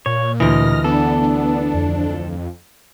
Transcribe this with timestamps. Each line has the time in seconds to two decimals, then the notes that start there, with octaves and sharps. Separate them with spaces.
0.06 A#2 C#5
0.40 D2 E3 D#5 F6 A#6
0.84 B3 D4 A4
1.74 F2